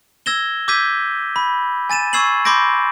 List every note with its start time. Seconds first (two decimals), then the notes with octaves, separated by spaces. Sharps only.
0.26 E6 G#6 A#6 E7 G7
0.68 D6 E6 G6 G#6 B6 D#7
1.36 B5
1.90 G#5 A6 D#7 E7
2.13 C#6 E6 G#6 C7 E7 F#7
2.45 B5 C6 D6 G6 A#6 D7